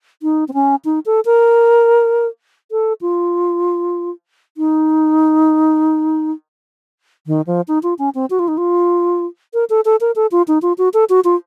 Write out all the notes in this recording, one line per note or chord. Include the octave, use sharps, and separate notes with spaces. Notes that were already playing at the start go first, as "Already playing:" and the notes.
D#4
C4
C#4
D#4
A4
A#4
A4
F4
D#4
D#3
F3
D#4
F4
C#4
C4
F#4
F4
D#4
F4
A#4
A4
A4
A#4
A4
F4
D#4
F4
F#4
A4
F#4
F4